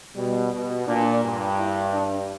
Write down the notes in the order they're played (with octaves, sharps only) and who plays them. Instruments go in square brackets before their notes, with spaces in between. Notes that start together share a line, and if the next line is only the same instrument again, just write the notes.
[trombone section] B2 [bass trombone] G3
[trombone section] B2
[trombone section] A#2 [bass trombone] D4
[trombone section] G2
[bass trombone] E4
D4